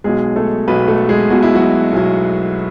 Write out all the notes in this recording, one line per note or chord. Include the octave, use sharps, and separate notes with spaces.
B1 B2 F#3 G#3 G#4
A3 A4
B1 B2 F#3 B3 B4
A3 A4
G#3 G#4
B1 B2 F#3 F#4
E4
F#3 F#4
B1 B2 F#3